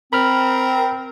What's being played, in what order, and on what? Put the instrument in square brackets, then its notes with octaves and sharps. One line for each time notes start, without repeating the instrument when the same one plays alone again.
[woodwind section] C4 [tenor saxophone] A#4 [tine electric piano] B5 F6